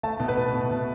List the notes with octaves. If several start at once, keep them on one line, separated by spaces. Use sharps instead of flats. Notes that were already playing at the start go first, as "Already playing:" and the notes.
A3 A5
B2
B4
B2
B2
B2